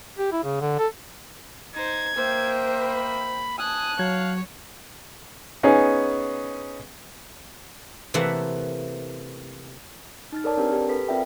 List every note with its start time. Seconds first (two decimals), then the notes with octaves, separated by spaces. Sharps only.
0.19 G4
0.32 E4
0.44 C#3
0.61 D3
0.79 A4
1.75 D#4 C5 G#6
2.16 A#3 C5 E5 G5
2.79 B5
3.59 G#5 A5 D#6 F#6
3.99 F#3 C#5 F5 G#6
5.63 B3 C#4 D#4 G#4
8.14 C3 E3 A3 A#3 E5 F#5
10.32 D#4 F6 A6
10.44 A4 A#4 C#5 D5 A5
10.57 C4 D4 G4 A#4 B4
10.73 G4
10.89 A4 B4 B6
11.08 C4 F4 A#4 D5 E5 G5